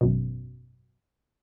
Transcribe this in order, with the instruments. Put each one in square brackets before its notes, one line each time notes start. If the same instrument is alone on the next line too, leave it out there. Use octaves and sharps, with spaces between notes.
[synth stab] G#1 F#2 B2